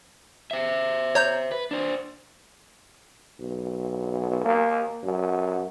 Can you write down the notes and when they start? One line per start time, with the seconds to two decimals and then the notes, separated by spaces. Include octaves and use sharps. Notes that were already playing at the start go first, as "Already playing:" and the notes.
0.51 C5 E5
1.15 C#5 A#5 G6
1.52 B4
1.71 D4 C5
3.40 B1
4.45 A#3
5.04 F#2